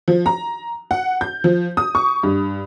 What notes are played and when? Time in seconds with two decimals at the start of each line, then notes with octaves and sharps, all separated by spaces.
0.08 F3
0.26 A#5
0.91 F#5
1.21 G6
1.44 F3
1.77 D#6
1.95 C#6
2.23 G2